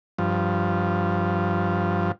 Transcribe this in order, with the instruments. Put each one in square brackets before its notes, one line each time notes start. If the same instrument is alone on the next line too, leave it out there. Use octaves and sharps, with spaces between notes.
[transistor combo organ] G2 F3